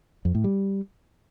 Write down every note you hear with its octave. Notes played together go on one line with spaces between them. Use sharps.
F2
A2
G3